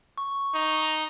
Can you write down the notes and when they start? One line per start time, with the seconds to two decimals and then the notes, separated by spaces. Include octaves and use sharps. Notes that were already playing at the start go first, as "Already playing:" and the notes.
0.18 C#6
0.55 D#4